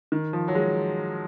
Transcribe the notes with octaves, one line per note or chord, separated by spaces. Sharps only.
D#3
F3
F#3
G#3